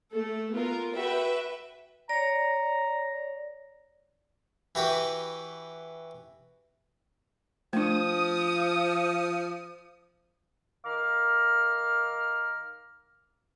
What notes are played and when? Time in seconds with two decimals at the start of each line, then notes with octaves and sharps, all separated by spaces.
0.12 A3 A4
0.52 B3 F4 A#4
0.94 F#4 B4 E5 G5
2.09 C#5 D5 A#5
4.75 E3 F#4 G4 B4
7.73 F3 A3 D4 D#6
10.84 D#3 A#4 F5 A#5 D6 F6